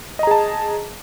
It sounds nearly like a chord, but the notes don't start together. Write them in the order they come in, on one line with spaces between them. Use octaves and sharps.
D#5 A#5 G#4 A5